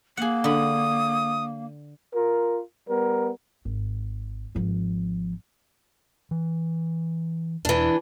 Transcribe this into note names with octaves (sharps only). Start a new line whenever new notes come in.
A#3 G#4 F#5
D3 B5 D#6
F4 A#4
G3 B3 A#4
G#1
G#1 F3
E3
E2 B2 E3 D4